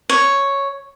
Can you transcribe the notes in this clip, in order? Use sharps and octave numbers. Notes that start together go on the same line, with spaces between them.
C#5